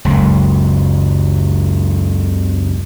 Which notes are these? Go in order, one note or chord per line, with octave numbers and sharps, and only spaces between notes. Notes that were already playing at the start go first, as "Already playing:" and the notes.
F#1 C#2